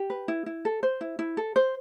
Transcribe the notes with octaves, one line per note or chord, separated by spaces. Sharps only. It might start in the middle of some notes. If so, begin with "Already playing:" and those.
Already playing: G4
B4
E4
E4
A4
C5
E4
E4
A4
C5